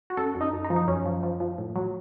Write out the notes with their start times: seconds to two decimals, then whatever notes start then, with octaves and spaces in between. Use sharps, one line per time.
0.10 F#4
0.17 F#2 A4
0.35 F#2
0.41 D#4
0.53 F#2
0.65 D#4
0.70 F3
0.76 D#4
0.88 F#2 C#4
1.05 F3
1.23 F3
1.40 F3
1.58 A2
1.76 F#3